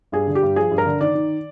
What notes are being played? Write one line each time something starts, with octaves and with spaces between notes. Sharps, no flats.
G2 G#4
D3
G4
G2
F3 G#4
G2
A#4
D3
D#3 D5
D#3